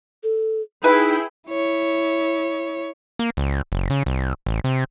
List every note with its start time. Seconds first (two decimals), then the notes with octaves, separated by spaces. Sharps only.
0.23 A4
0.84 D#4 E4 G#4 B4 G5
1.49 E4 C#5
3.19 A#3
3.37 C#2
3.72 F#1
3.90 C#3
4.06 C2
4.46 A1
4.64 C3